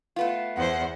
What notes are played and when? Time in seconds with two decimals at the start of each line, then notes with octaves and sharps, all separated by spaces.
0.16 A3 B3 F4
0.56 E2 C5 F#5